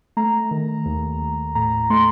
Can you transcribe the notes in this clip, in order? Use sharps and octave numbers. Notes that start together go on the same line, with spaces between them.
A3 A#5
D#3
D#2
D#2
A2 A#5
A3 C6